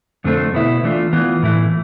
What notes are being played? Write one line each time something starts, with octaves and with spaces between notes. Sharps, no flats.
F2 D3 A3 C4
B2 B3 E4
E3 A3 D4 F4
E3 B3 F4
A2 E3 A3 E4